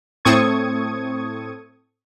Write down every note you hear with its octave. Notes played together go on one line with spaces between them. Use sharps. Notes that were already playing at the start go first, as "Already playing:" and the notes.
A2 C4 A4 C#6 D#6 G#6